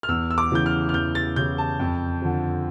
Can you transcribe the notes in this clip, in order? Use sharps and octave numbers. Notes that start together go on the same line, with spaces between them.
F6
E2 E6
E6
D6
C#3 E3 G6
F6
F6
E2 G6
A6
C#3 E3 G6
A5
F2
D3 F3